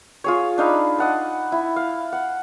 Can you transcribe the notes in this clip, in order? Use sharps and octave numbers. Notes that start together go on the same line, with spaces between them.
F4 G#4 C#5
D4 D#4 F5 B5
D#5 F#5 A5
E4
F5
F#5